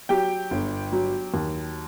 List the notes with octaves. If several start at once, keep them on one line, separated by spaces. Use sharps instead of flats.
F#3 G4 G5
G1
F#3
D#2